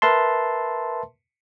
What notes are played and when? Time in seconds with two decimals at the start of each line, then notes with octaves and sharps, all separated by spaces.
0.02 A#4 B4 E5 A5 C6